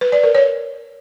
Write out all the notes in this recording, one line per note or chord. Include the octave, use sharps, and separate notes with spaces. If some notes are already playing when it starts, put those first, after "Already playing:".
B4
D5
A#4
C#5